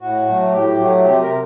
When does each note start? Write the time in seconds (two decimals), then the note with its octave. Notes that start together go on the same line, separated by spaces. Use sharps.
0.01 A2 F#4
0.27 F#3 A3
0.52 A2 G4
0.78 F#3 A3
1.05 C3 G4
1.22 A#4